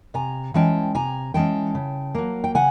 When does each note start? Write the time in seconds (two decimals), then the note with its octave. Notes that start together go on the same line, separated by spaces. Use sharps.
0.14 C3 G#5 A#5
0.54 E3 G#3 C#4 G5 A5
0.95 C3 G#5 A#5
1.34 E3 G#3 C#4 G5 A5
1.75 C#3
2.15 F#3 A#3
2.44 G5
2.55 C#3 F#5 G#5